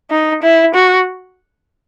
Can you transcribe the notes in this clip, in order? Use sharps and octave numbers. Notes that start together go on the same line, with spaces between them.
D#4
E4
F#4